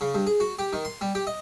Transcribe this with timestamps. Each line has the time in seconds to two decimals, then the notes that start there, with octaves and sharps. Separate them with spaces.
0.01 C#3
0.15 G2
0.27 G#4
0.40 F#4
0.59 G4
0.73 D#3
0.85 C6
1.01 G3
1.15 G4
1.27 D#5